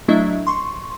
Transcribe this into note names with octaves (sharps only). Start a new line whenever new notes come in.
F#3 A3 D4 E4 D#5 E5
C6 C#6